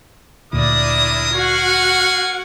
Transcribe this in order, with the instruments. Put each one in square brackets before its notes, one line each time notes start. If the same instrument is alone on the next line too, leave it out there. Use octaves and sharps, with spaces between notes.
[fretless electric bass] D2 A#2 [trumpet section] D4 A#4 D#6 [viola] E4 D5
[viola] F#4 F#5 [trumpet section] A#4 F5 G#5